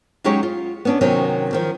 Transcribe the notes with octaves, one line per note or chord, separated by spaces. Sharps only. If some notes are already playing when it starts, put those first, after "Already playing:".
F#3 G#3 C#4 D#4 G4 C#5
F4
B3 C#4 D4
C3 D#3 F#3 C4 C#4
D#3 F3